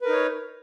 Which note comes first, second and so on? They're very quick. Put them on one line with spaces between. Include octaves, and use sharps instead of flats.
B4 A#4 D#4 C#5